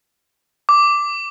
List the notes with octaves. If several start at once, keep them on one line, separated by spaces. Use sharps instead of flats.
D6